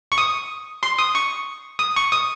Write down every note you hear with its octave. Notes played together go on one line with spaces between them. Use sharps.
C#6
D#6
C6
D#6
C#6
D#6
C#6
D#6